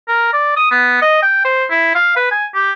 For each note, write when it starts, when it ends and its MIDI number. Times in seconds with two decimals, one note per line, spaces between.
0.08 0.29 70
0.33 0.57 74
0.57 0.69 87
0.71 0.97 59
1.02 1.22 75
1.23 1.40 79
1.45 1.65 72
1.70 1.92 64
1.95 2.12 77
2.16 2.31 71
2.31 2.46 80
2.55 2.72 67